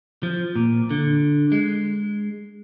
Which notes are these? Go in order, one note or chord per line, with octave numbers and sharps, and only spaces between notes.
F3
A#2
D3
G#3